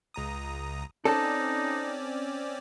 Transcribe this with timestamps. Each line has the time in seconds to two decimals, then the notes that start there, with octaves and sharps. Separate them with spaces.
0.14 C#2 A#5 D#6
1.05 C4 C#4 D#4 A4 D5